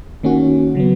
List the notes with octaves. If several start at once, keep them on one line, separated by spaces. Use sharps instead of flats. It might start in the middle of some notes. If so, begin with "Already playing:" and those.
D#3 A#3 C#4 F#4
C#3 F#3 B3